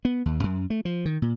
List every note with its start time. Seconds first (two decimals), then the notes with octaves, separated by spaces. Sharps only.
0.05 B3
0.26 D#2
0.43 F#2
0.70 A3
0.85 F3
1.05 D#3
1.22 A#2